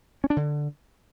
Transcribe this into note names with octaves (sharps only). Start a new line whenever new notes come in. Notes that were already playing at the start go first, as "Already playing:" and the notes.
C#4
D4
D3